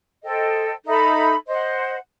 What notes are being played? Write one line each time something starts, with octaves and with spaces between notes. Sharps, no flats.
A4 C5 D#5 G5
D#4 A4 E5 B5
C5 D#5 F#5